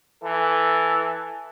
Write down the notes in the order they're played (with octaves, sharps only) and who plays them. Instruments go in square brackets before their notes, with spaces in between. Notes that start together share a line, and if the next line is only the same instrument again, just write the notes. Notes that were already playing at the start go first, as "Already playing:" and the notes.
[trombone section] E3 A4